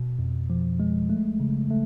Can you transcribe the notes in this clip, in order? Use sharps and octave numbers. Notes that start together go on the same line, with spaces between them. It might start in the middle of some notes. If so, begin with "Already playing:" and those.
Already playing: B2
F2
F3
G#3
A3
C#3
A3